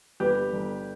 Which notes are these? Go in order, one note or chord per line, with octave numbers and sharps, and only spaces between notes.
G1 G4 B4
G1